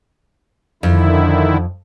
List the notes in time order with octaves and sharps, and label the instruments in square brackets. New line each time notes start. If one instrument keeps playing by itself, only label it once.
[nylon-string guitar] F2 [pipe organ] D3 D#3 E4